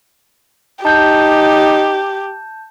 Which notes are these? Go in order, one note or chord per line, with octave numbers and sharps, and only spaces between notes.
D#4 G4 A5 G6